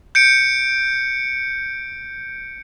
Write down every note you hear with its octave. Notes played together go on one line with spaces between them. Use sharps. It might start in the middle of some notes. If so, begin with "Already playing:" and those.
G6 C#7 D7